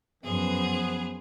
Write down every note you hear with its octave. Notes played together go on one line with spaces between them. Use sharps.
F#2 F3 B3 G#4 C5